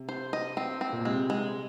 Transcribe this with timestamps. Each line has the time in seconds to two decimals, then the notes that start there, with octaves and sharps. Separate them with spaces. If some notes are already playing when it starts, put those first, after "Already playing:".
Already playing: C3
0.09 C5
0.33 D#5
0.57 C4
0.81 C4
0.92 A#2
1.05 C3 G#3
1.30 G#3